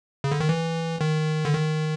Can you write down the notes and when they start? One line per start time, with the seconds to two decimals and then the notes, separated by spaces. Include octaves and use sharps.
0.24 C#3
0.32 D3
0.40 D#3
0.49 E3
1.01 D#3
1.45 D3
1.54 D#3